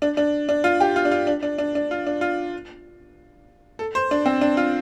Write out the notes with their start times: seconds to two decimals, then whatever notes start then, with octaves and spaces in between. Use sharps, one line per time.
0.02 D4
0.17 D4
0.49 D4
0.64 F4
0.80 G4
0.96 F4
1.05 D4
1.11 F4
1.27 D4
1.43 D4
1.58 D4
1.75 D4
1.91 F4
2.07 D4
2.21 F4
3.79 A4
3.95 C5
4.11 D4
4.26 C4
4.41 D4
4.57 F4